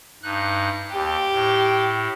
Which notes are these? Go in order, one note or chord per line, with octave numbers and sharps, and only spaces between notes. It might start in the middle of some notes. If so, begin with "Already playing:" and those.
G2 D#4 F#6
D#2 G4
A2